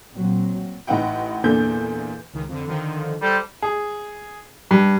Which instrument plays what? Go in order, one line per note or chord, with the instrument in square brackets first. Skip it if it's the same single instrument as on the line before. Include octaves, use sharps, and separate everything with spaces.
[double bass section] A#2 F#3 C4
[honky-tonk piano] A1 D#4 B4 F#5 G5
E2 A#2 D3 A#3 A4 G6
[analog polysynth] C#2 D#3
F2 D3
D3 D#3 F3
[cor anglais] G3 [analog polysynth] A4 C5
[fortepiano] G#4
G2